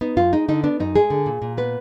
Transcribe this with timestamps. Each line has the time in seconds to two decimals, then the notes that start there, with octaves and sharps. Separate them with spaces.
0.01 B3 D#4
0.17 F#2 F4
0.32 G#3 D#4
0.48 D3 D#4
0.64 B3 D4
0.80 F#2 D#4
0.96 G#3 G#4
1.10 D3
1.26 A#2
1.42 A#2
1.58 B3 B4